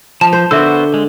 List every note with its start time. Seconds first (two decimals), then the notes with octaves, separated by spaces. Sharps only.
0.21 F3 A5
0.33 C5
0.51 D3 B3 F#4 A#4 C5 E5 E6
0.94 G#3